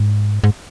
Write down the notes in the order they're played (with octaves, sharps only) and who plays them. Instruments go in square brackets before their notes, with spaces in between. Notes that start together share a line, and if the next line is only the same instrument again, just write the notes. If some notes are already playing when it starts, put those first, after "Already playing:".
Already playing: [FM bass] G#2
G#2